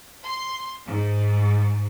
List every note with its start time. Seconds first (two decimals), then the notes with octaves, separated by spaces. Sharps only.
0.23 C6
0.86 G#2